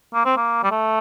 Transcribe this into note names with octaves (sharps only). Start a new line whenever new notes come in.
A#3
C4
A#3
G3
A3